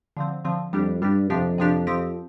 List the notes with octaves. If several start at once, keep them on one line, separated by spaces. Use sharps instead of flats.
D3 F3 C4
D3 F3 C4
F2 G3 D4 G4
G2 G3 D4 G4
F2 C3 F3 D4 G4
C3 F3 D4 G4
F3 C4 G4